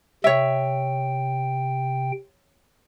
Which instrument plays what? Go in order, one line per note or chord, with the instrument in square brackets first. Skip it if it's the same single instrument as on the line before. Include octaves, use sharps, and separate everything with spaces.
[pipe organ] C3 G5 [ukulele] C#5 E5